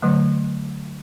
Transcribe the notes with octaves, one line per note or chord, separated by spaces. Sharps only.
D3 F#3 A3